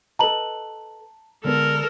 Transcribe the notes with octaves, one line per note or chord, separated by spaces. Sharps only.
A4 B4 D#5 A5 A#5 F#7
D3 G#3 B3 A4 A#4